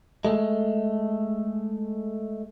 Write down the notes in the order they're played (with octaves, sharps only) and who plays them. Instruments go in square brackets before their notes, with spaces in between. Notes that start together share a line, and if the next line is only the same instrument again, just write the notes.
[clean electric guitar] G#3 A3